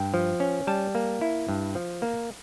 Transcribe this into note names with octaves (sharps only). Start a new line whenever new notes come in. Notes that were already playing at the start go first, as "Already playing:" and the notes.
Already playing: G2 G5
F3
C#4
G3 A5
A#3
E4
G2
F3
A#3